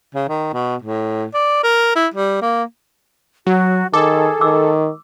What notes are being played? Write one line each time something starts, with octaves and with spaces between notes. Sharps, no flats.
C#3
D#3
B2
A2
D5
A#4
E4
G3
A#3
F#3 F#4
D#3 G#4 A4 D6
D#3 D6 E6